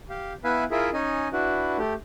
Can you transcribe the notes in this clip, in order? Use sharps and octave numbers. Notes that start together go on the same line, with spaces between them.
G4 F5
B3 E4 B4 E5 F5 G#5
E4 F4 G#4 A#4 E5
C#4 D#4 D#5 G#5
D4 E4 F#4 B4
A3 G4